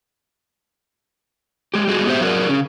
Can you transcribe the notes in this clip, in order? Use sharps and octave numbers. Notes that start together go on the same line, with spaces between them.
G#3 G4
G3 G#3 F#4 G#4
B3 G4 C5 E5
F#3 F#4 G#4 A#4 D5
C#3 C#4